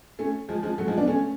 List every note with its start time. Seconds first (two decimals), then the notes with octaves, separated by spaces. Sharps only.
0.19 A3 C#4
0.49 F3 G#3
0.63 F3 G#3
0.78 F#3 A3
0.88 F3 G#3
0.97 B3 D4
1.08 A3 C#4